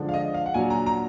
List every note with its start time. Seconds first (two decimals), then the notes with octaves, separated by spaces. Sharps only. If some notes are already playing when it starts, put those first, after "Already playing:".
Already playing: D3 F3 G#3 D4
0.09 F5
0.14 D#5
0.34 F5
0.46 F#5
0.54 A#2 F#3 D4 G#5
0.70 A#5
0.86 A#5